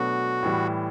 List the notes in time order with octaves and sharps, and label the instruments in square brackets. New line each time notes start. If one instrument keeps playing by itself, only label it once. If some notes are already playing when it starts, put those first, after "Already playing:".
Already playing: [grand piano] B2 F#3 A3 D4 [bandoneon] F#4
[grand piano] A2 E3 G3